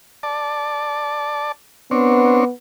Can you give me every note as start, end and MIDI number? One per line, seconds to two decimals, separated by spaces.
0.23 1.52 74
0.23 1.52 81
1.91 2.51 59
1.91 2.45 60
1.91 2.45 62
1.91 2.45 73